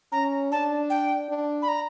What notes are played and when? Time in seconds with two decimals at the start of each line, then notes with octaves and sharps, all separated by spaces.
0.12 C#4 A#5
0.51 D4 A5
0.90 G5
1.29 D4
1.62 B5
1.68 A#5